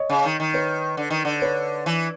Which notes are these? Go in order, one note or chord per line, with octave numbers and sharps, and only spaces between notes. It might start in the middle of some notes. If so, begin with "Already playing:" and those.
Already playing: C#5 D#5
C#3
D#3
D#3
B4 C#5
D3
D#3
D3
B4 C#5
E3